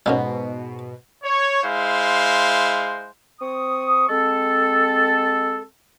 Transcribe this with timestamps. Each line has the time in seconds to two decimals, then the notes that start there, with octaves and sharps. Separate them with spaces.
0.06 G#2 B2 G#3 A#3 C#4
1.23 C#5
1.63 G#3 E4 C5 F5
3.41 C4 C#6 D#6
4.09 G#3 C4 A4